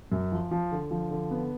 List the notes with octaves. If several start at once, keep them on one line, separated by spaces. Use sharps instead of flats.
F#2
F3
F3
D3
F3
D3
B3